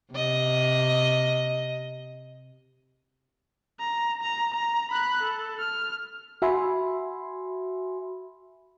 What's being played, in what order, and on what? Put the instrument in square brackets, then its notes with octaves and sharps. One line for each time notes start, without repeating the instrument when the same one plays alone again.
[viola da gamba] C3 D#5
[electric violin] A#5
A#5
A#5
B5 F#6
A4
F6
[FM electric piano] F#4 E5 G#5 B5 C6